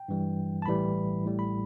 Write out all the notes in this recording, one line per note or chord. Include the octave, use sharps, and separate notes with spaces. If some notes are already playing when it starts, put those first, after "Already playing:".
Already playing: G5
G2 E3 G3
A5
A1 A2 E3 G3 B5
A1 A2 G3
B5